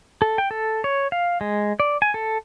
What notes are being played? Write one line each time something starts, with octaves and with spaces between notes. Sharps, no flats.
A4
G5
A4
C#5
F5
G#3
D5
G#5
A4